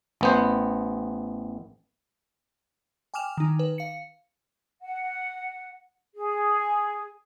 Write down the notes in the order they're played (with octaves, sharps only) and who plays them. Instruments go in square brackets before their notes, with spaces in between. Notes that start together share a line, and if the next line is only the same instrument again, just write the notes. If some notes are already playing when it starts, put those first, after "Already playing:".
[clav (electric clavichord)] A1 B3 C5
[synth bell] G5 G#5 D6 F6 E7 F7
D#3 D#4
B4
F5 C#7
[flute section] F#5
G#4